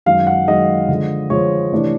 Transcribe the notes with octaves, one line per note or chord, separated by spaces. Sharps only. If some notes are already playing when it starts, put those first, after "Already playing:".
F#2 D#3 G#3 F5
F#5
F#2 D#3 G#3 D#5
D3 F3 G#3
D3 F3 G#3 C#5
C3 E3 A3 D4